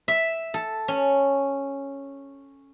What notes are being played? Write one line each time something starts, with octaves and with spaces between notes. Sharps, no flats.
E5
A4
C#4